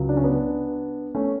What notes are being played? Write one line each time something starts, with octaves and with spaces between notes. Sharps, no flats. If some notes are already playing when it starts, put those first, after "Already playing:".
Already playing: C#2 C#3 F#3
D4
C#4
B3 D4
A3 C#4